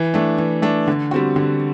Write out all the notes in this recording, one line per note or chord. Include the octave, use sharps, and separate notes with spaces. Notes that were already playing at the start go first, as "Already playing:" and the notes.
Already playing: E3
A3 D4
E3
A3 D4
D3
G3 C4 F#4
D3